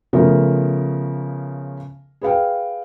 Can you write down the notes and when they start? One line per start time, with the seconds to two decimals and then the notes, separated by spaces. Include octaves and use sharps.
0.13 C#3 F3 A3 B3 A#4
2.22 G#4 B4 F5 G5